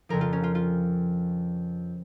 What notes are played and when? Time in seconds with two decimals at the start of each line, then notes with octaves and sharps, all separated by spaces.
0.09 F2 C#3 F3 A#4
0.21 F4
0.33 C#4
0.43 F4
0.55 F4